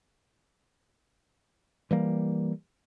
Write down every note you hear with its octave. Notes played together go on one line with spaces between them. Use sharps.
E3 G3 A#3